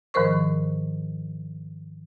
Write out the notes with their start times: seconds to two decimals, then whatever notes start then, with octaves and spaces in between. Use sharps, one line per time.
0.14 G#2 D#3 F3 A#4 C5 C#6